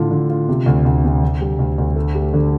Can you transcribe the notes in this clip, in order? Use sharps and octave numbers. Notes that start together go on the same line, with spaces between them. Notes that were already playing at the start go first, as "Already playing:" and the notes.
Already playing: A2 D3 F4
D3
F4
C3
D2
D2
C3
D3
G3
D2
D2
A3
G4
D3